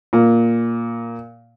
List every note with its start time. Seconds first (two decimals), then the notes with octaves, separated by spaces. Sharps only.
0.13 A#2